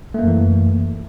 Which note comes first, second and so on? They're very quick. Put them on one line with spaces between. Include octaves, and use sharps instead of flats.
A3 A#3 F#2 E3